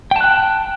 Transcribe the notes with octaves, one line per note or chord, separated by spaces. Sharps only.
G5 A5 F#6